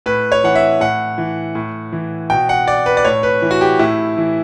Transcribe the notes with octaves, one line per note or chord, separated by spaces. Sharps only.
A2 B4
C#5
E3 F#5
E5
A2 F#5
E3
A2
E3
B2 G5
F#5
D5
B4
D5
A2 C#5
B4
E3
F#4
G4
A2 E4
E3